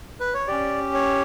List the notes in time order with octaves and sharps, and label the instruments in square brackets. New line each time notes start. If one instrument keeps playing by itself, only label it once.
[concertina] B4
C#5
C#4 G4 D5
C#5